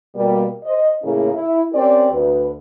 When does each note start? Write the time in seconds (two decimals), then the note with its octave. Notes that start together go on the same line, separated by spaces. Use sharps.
0.16 B2 G3 A#3
0.65 C5 D#5
1.04 A2 C#3 A#3 C#4 E4 G#4
1.34 E4
1.73 C4 C#4 G4 A#4 D5
2.12 D2 B4